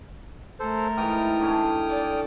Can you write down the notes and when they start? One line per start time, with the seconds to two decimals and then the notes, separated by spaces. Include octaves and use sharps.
0.60 A3 A4 A#4 C5
0.98 G#2 E3 G5 D#6 F6
1.40 D3 C#4 G#5
1.88 A4 D5